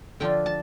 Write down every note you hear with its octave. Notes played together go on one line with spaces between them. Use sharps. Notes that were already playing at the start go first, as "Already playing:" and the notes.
D3 F3 D4 F4 G5
A5